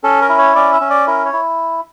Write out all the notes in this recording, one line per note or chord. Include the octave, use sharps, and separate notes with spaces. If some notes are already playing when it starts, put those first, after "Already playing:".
C#4 A4
A#4
E4
C#5
C#4 D5
E5
C#4
D5
E4 A#4
C#5
E4